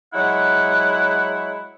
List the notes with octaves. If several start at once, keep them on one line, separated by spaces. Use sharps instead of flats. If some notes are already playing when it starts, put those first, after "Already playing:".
F#3 G#3 E4 F#5